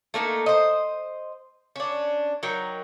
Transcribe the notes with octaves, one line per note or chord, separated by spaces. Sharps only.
A3 A#3 C4 D#4
C5 D#5
C#4 D4
F#3 D#4 A#4 G5